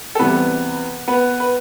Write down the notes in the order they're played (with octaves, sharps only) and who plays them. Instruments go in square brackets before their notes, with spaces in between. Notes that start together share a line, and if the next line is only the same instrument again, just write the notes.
[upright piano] A4
E2 C3 E3 G3 B3 B4
B3 B4
B4